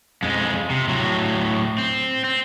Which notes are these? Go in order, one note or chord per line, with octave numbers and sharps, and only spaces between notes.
F2 G#3
C3
A2 F#3
C4
C4